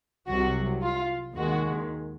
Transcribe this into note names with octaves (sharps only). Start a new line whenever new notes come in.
C2 C3 F#3 F#4
F4
D#2 D#3 G#3 F#4